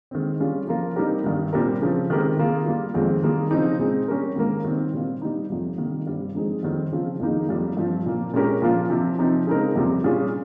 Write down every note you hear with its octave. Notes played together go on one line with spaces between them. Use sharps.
D#3 G#3 C4
G3 C#4 F4 G#4
F3 A#3 F4 A#4
G3 C4 D#4 G4 A#4
G2 D#3 G3
A#2 G3 C4 G4 A#4
C#3 F3 C4
D#3 G#3 C4 G4 A#4
D#3 A#3 F4 G#4
G3 A#3 F4
F2 D#3 G#3 C4
D#3 G3 A#3 F4 G#4
C#3 F3 C4 D#4
A#2 G#3 C4
G3 C#4 G4 A#4
G#2 D#3 A#3 F4 A#4
D#3 G3 C4 D#4
A#2 G3 C4 F4
G3 C4 D#4
F2 C3 G3
C3 D#3 G3 A#3
G2 G3 C4
G#2 F3 C4 D#4 G#4
F2 D#3 G3 C4 D#4
C#3 F3 C4 F4
F2 D#3 A#3 D#4 G#4
F2 C3 G3 A#3
G2 F3 C4
A#2 F3 A#3
A#2 G#3 C#4 G4 A#4
A#2 F3 A#3 F4
C3 F3 C4
C3 F3 C4 D#4
C#3 G#3 C4 D#4 A#4
F2 C3 G3
A#2 G3 C#4 F4 G#4